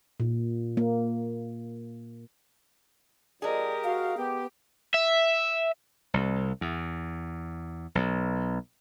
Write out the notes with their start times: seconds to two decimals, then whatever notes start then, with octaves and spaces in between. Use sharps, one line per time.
0.20 A#2
0.77 A#3
3.42 F2 G#3 G4 G#4 A#4 D5
3.84 F#4 F5
4.17 B3 G4
4.94 E5
6.14 C2
6.61 E2
7.95 B1